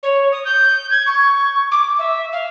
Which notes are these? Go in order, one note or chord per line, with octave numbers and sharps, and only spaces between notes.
C#5
D#6
G6
G#6
C#6
D6
E5
F5